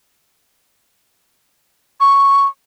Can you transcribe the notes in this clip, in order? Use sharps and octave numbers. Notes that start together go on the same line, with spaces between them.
C#6